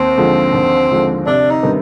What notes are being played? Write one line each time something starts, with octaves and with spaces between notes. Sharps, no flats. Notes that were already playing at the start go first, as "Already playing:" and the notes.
Already playing: D#2 C4
D3 F3 G#3
D#2
D3 F3 G#3
C3 D4
D#4
D#3 G3 B3 D4